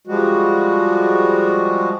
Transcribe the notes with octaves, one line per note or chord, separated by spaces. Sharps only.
F3 G3 G#3 F#4